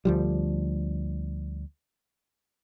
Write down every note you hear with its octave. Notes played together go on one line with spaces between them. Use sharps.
D2 F3 G3